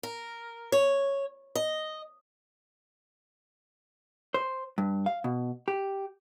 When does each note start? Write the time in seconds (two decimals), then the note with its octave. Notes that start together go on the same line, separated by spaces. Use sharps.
0.03 A#4
0.72 C#5
1.55 D#5
4.34 C5
4.78 G2
5.06 F5
5.24 B2
5.68 G4